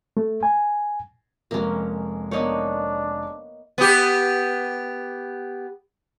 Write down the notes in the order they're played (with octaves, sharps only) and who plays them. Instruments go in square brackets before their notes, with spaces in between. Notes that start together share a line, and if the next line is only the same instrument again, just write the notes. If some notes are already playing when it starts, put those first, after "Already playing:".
[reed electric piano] A3
G#5
[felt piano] F1 G#3 [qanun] A#3 C#4
[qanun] A#3 B3 D#4 [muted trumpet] D4 [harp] C#5 D#5
[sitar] B3 G4